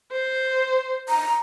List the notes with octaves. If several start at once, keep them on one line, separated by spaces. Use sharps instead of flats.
C5
A#5